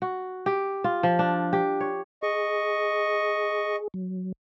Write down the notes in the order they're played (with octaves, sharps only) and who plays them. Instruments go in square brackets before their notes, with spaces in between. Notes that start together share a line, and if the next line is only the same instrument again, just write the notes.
[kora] F#4
G4
F4
F3
D4
G4
C#5
[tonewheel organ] G#4 [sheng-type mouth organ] D#5 C#6
[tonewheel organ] F#3